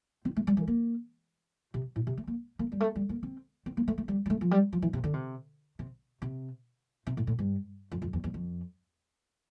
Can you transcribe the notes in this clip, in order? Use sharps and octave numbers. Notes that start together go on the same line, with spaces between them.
C4
A3
G3
E3
A#3
C3
A2
C3
A3
A#3
A#3
G3
A3
G3
A#3
C4
C4
A#3
A3
A3
G3
G3
A3
F3
G3
F3
E3
C3
D3
C3
C3
C3
C3
A2
A2
G2
F2
F2
E2
E2
F2